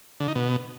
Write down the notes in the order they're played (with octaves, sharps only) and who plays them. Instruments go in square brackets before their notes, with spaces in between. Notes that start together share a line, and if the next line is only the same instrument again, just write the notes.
[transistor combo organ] D3
D#4
B2